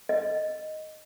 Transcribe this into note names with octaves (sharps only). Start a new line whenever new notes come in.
D#5